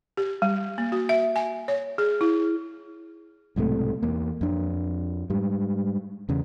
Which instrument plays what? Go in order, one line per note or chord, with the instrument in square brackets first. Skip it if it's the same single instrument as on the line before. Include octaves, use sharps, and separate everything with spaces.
[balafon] G4
G3
A#3
F#4
E5
G#5
C#5
G#4
E4
[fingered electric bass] B1 G#2 C3 A3
E2 A#3
F2 D4
G#2 G3
E2 C#3